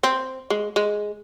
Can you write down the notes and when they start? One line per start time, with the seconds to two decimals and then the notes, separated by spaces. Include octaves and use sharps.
0.03 C4
0.50 G#3
0.76 G#3